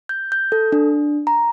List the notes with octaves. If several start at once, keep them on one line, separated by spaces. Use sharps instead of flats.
G6
G6
A4
D4
A#5